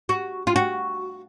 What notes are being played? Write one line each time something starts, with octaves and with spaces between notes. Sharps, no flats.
F#4
F4
F#4